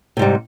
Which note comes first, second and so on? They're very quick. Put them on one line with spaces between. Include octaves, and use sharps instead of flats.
C3 G#2 G3